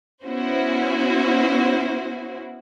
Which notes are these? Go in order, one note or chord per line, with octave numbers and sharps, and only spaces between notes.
B3 C#4 E4 F#4 C5